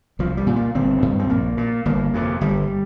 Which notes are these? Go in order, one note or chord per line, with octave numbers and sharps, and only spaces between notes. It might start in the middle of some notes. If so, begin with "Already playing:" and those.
C2 F3
G3
A#2
A#3
G1 C4
G2
C4
A#1 A#3
A#2
G1 A#3
F2 C3
G1 G3